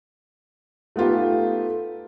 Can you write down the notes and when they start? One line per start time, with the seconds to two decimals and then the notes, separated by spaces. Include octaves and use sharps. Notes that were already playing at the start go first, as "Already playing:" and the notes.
0.96 A3 B3 D#4 F4 G4